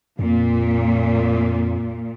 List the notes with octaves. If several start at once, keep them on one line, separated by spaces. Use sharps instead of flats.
F2 A#2